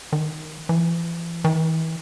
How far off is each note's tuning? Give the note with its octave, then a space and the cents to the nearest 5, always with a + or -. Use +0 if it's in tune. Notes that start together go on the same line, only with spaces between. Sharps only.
D#3 +5
E3 +40
E3 -35